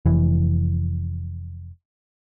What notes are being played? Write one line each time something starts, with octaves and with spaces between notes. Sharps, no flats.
F1 E3